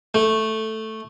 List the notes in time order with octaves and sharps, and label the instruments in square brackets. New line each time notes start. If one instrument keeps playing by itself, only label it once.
[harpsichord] A3